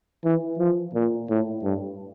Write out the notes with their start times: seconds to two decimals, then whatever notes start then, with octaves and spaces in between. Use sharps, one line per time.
0.25 E3
0.59 F3
0.94 A#2
1.29 A2
1.63 G2